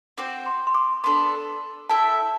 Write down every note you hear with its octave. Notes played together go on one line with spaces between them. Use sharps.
C4 F#4 C5 G5 D6
C6
C6
D6
B3 D4 A4 C6
E4 A4 E5 G5 A5